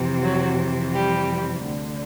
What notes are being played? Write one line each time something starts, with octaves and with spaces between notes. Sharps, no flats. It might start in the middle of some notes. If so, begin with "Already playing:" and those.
Already playing: F2 C3 E3
F#3 F#4
G3 G4
D2 D3